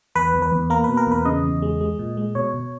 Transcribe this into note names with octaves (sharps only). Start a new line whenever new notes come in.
E2 B4
E2
B4
E2
A#3 A#4
B2 B4
A#4
E2 B4
C#3 D#5
E2
G#3
G#3
A#2
G#3
B2 C#5
B2